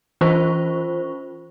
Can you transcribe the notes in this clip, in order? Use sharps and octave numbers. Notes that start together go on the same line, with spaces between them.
E3 C#4 F4 C5 C#6